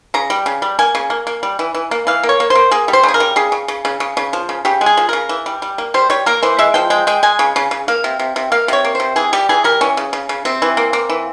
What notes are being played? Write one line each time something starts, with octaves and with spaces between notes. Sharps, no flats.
C#3 A#5
G3
C#3
G3
A#3 G#5
C#3
A#3
A#3
G3
E3
E3
A#3
E3 F5
A#3
C#5
A#3
C5
A#3
A#3 G#4
G3
C5
C#3 G#4
A#4
G3
C#3 G#4
C#3
C#3
C#3
C#3
C#3
F3
C#3
C#3 G4
G#3
G#4
F3
C#3 A#4
E3
G3
G3
A#3
G3 C5
G3 C#5
A#3 A#4
E3 C5
G#3 E5
F3 G5
G#3 G5
G#3 G5
G#3 G#5
C#3
C#3
C#3
A#3 F5
C3
C3
C3
A#3 F5
C3 C#5
A#3
C3 C5
E3 G#4
G3 G4
E3 G#4
G3 A#4
E3 C#4
C#3
C#3
C#3
C3 C4
E3
A#3
A#3
E3